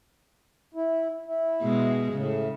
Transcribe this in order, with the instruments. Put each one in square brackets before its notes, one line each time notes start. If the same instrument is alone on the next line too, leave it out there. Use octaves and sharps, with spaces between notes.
[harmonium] E4
E4
[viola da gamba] B2 G#3
[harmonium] A2 [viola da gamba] C#3